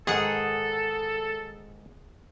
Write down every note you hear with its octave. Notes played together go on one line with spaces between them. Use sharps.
G#2 D#3 G#4 A4 F#5